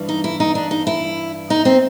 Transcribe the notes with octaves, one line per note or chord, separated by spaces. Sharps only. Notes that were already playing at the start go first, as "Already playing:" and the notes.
Already playing: G2 E3
D#4
E4
D#4
D4
D#4
E4
D#4
C4